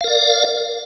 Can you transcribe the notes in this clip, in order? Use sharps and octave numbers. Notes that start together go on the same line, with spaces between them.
A#4 D5 F5